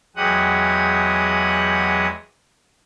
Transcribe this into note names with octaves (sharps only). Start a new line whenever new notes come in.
E2 F#3 G#3 G4 F#5 D#6